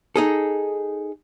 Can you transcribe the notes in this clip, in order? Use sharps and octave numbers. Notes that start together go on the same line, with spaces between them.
D#4 G#4 A4